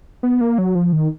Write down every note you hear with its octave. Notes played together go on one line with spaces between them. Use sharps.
B3
A#3
F#3
F3
D#3